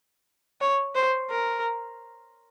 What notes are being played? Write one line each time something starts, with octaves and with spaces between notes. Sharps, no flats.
C#5
C5
A#4